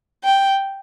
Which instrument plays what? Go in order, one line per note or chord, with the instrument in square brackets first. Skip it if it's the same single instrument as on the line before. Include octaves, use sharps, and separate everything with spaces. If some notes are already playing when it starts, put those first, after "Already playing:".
[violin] G5